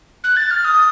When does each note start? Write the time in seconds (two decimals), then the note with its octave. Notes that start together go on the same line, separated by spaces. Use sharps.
0.24 F#6
0.37 A6
0.51 F6
0.65 D#6